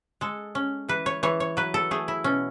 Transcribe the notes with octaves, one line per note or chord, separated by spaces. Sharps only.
G#3 A4
C#4
E3 B4
C#5
E3 C#5
C#5
F#3 B4
A4
A3 G#4
E4
B2 C#4